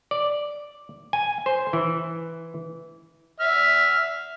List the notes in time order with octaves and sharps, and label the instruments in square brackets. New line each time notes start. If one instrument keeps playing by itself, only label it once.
[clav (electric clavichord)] D5
G#5
C5
E3
[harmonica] E5 F6